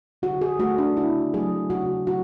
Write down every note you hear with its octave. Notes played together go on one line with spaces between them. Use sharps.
D3 F#4
G#4
A3 F#4
D4
C#3 E4
F#3 A3 G#4
C#3 F#4
F#3 A3 F#4